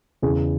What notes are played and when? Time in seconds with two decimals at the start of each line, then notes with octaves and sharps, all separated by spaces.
0.22 E2 C#3 E3 G#4